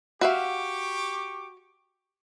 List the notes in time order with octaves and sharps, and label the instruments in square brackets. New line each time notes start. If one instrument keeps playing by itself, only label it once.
[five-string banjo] F#4 E5 F5 [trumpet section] G4 C#6 D6